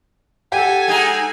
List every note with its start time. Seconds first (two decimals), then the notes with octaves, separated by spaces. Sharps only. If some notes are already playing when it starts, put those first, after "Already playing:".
0.52 G4 A4 F#5 G#5
0.88 G#3 D#4 G#4